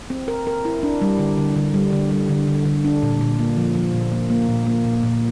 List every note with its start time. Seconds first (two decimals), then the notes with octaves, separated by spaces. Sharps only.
0.10 C4
0.28 A#4
0.47 A#4
0.65 E4
0.83 D4
1.02 G3
1.19 D3
1.38 D3
1.56 D3
1.74 G3
1.93 D3
2.11 G3
2.29 D3
2.47 D3
2.65 D3
2.84 D4
3.02 A#2
3.21 A#2
3.39 A#3
3.57 F3
3.75 F3
3.94 A#2
4.12 A#3
4.30 A#3
4.49 A#2
4.67 A#3
4.85 A#2
5.03 A#2